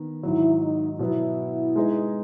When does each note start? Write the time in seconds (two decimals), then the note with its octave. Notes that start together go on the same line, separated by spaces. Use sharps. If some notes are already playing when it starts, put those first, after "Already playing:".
Already playing: D#3 B3
0.23 G#2 D#3 F#3 E4
0.62 D#4
0.99 B2 F#3 B3 E4
1.76 G#3 D#4 G#4 B4 D#5